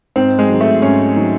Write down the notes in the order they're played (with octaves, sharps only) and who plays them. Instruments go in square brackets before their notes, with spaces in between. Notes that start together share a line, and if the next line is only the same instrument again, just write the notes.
[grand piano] G#2 [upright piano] C4
[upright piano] G#3
[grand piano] D#3 F#3
[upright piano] A3
[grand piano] G#2 [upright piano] C#4
[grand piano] D#3 F#3